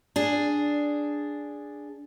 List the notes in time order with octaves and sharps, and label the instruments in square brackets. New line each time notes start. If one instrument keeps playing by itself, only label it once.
[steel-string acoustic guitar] D4 G#4